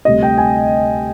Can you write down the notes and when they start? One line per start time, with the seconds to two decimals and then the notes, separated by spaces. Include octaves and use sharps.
0.05 D2 C3 G3 D#5
0.23 G5
0.38 G#5